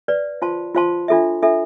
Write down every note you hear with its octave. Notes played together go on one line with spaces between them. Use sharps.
B4 D5 F5
F4 C5 F5 A5 C6
F4 C5 F5 A5 C6
D4 F4 A4 E5
D4 F4 A4 E5